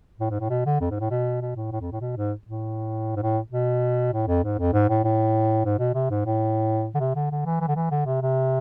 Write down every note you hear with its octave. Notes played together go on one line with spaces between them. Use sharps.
A2
G#2
A2
B2
D3
F2
G#2
A2
B2
B2
A2
A2
F2
A2
B2
G#2
A2
G#2
A2
B2
A2
F2
G#2
F2
G#2
A2
A2
G#2
B2
C3
G#2
A2
D3
C3
D3
D3
E3
E3
D3
E3
D3
C3
C3